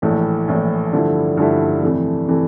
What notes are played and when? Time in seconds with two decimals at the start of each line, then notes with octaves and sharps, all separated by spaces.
0.02 A#1 A2 E3 A3
0.48 A#1 A2 E3 A3
0.92 G2 D3 F3 A3 E4
1.37 G2 D3 F3 A3 E4
1.82 F2 C3 E3 A3
2.28 C3 E3 A3